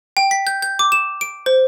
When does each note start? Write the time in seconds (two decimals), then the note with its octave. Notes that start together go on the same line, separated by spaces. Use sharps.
0.17 G5
0.31 B6
0.47 G6
0.62 G6
0.79 D6
0.92 E7
1.21 D7
1.46 C5